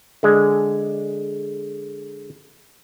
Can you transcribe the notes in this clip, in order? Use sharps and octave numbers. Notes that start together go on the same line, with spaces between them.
D3 G#3